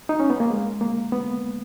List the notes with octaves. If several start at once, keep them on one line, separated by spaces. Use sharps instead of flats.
D#4
C#4
B3
A#3
G#3
A#3
B3